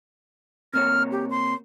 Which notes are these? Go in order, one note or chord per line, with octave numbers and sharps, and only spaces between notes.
C3 A#3 C#5 F6
G4
C6